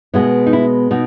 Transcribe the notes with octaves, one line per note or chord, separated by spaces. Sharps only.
B2 G#3 B3 E4
D#4
E4
B2 D#4